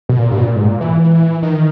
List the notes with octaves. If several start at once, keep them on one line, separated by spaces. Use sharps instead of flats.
B2
A#2
G2
B2
A#2
G#2
A#2
E3
D#3